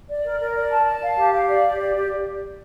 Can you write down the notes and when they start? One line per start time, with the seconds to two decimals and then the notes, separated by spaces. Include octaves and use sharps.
0.09 D5
0.25 A#4
0.40 A#4
0.56 D5
0.71 A5
0.87 A5
1.02 F5
1.17 G4
1.32 F5
1.48 D5
1.64 G4
1.79 D5
1.95 G4